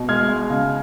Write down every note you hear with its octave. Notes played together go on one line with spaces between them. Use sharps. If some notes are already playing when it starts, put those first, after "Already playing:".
Already playing: B2
G#3 F6 G#6
G#3
C#3